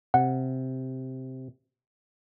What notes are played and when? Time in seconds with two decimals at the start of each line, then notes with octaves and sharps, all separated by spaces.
0.14 C3 F#5